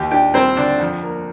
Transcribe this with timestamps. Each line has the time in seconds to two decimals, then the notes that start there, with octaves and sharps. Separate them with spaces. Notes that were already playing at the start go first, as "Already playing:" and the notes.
Already playing: D#2 G4 G5
0.11 D4 G4 G5
0.34 G3 C4 C5
0.57 D3 D4 D5
0.80 F2
1.03 A#3